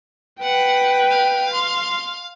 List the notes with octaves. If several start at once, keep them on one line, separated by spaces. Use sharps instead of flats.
B4 F#5 G5
F5
C6